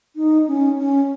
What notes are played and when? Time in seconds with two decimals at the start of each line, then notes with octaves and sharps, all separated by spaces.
0.16 D#4
0.48 C#4
0.79 C#4